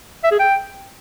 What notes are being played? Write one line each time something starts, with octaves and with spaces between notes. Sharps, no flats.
E5
G#4
G5